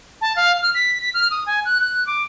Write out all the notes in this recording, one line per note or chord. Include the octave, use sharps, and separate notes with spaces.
A5
F5
F6
B6
B6
F6
D#6
G#5
F#6
F#6
D6